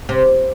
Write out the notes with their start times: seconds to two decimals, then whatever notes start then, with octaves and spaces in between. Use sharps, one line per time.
0.09 C3